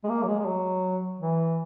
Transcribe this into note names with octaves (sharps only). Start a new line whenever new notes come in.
G#3
A#3
F#3
G#3
G#3
F#3
E3